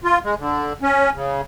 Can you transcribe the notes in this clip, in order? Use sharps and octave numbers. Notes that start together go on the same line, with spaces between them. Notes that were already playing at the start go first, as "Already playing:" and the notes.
F4
G#3
D3
C#4
C#3